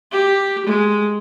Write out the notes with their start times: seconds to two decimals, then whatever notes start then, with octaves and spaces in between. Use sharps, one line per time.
0.12 G4
0.66 G#3